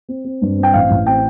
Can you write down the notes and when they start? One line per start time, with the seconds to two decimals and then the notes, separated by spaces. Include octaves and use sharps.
0.09 C4
0.25 C4
0.42 G2
0.58 C4
0.63 G5
0.74 A1 F5
0.90 A1
1.06 C4 G5